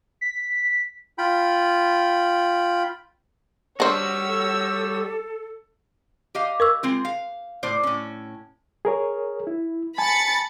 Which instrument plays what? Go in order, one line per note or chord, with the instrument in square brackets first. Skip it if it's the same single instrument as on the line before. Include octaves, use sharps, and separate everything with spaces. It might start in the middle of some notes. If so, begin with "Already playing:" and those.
[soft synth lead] B6
[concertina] F4 G5 B5
[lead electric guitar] G3 F#4 [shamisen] D4 C5 [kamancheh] C#5 E6
[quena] A4
[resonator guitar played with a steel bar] G4 D#5 F5
[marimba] A#4 C#6 E6
[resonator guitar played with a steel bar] G#3 C4 F4
F5
A2 C5 D5
A2 C#4
[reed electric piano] G#4 A#4 C#5
E4
[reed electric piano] G#5 A5 [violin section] B5 A6 C#7